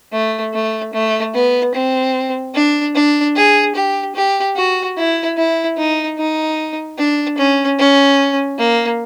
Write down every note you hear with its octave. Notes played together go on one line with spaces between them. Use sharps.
A3
A3
A3
B3
C4
D4
D4
G#4
G4
G4
F#4
E4
E4
D#4
D#4
D4
C#4
C#4
A#3